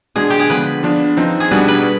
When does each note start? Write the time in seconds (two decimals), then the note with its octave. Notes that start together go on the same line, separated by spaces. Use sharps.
0.16 B2 G#3 D4 G#4
0.30 G4
0.40 G#4
0.50 D3 F3 B3 B4
0.83 F3 B3 D4
1.17 F3 C4 D#4
1.40 G#4
1.51 B2 G3 B3 D4 B4
1.68 B4